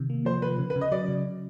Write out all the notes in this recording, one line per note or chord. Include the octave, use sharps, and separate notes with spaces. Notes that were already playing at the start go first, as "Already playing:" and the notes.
Already playing: C3 D#3
A#3
F3 C5
F3 B4
C#3
B4
C#3
D#5
F#3 D5
C#3